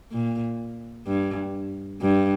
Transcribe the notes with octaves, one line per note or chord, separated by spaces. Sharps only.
A#2
G2
G2